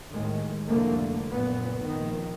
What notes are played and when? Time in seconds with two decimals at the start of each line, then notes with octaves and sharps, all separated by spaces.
0.12 D#2 A2 D#3 G#3
0.68 F1 C2 F2 D3 A3 A#3
1.32 F#1 A#2 B3
1.87 A#1 D#3